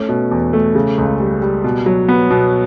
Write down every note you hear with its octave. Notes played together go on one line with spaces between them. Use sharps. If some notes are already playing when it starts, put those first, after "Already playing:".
Already playing: A3 C#4
B2
E2
A3
C#3
C#2
G3
G3
B2
F#3
B3
B2